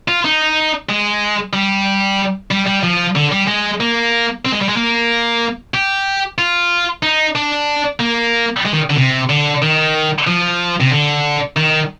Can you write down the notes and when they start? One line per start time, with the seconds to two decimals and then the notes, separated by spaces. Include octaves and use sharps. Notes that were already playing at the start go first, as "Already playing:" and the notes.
0.08 F4
0.25 D#4
0.89 G#3
1.53 G3
2.51 G3
2.67 G3
2.83 F3
3.16 D3
3.32 G3
3.48 G#3
3.80 A#3
4.45 C4
4.52 G#3
4.61 G3
4.69 G#3
4.76 A#3
5.74 G4
6.38 F4
7.03 D#4
7.35 D4
8.00 A#3
8.65 G#3
8.73 D#3
8.90 D3
8.97 C3
9.29 D3
9.62 D#3
10.27 F3
10.80 C3
10.91 D3
11.56 D#3